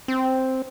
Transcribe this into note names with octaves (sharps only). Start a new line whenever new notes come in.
C4